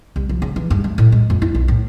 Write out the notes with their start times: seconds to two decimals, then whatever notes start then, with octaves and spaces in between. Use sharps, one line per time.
0.16 C2
0.29 F3
0.42 C#3
0.56 E3
0.70 G2
0.84 A3
0.98 A2
1.12 G#3
1.30 F2
1.42 E4
1.55 B1
1.68 A2